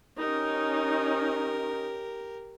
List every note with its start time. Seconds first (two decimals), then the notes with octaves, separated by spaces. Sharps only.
0.19 C#4 D#4 G4 A#4